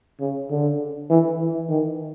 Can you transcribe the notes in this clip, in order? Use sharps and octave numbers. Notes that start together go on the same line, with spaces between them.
C#3
D3
E3
E3
D#3